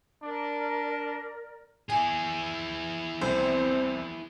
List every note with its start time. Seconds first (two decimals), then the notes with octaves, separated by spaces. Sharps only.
0.23 D4 A#4 D5
1.90 E4 G#4 G#5
3.22 C2 C3 C4 C5